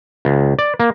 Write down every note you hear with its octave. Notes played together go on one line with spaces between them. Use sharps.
C#2
D5
A#3